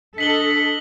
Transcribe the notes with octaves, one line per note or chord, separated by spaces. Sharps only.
D4 A4 D#5 B6 F#7 G7